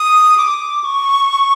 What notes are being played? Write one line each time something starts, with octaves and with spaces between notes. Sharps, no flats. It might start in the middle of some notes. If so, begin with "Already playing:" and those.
Already playing: D#6
D6
C#6